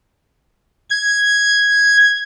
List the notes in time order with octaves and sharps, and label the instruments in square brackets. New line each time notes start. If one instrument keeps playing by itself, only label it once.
[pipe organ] G#6